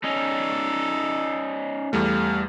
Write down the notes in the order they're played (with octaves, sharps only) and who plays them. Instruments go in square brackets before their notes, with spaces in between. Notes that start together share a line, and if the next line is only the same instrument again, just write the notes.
[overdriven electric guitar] C#4 D#4 [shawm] A4
[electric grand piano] E2 G3 A3 [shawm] F5